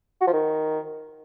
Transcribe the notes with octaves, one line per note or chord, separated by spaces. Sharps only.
F#4
F3
D#3